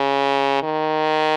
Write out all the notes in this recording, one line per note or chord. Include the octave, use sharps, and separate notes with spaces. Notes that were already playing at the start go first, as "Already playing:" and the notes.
Already playing: C#3
D#3